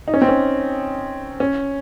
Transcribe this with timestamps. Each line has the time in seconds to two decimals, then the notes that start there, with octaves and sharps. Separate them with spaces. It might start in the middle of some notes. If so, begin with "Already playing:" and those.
0.08 D#4
0.14 C#4
0.22 C4
0.29 C#4
1.40 C#4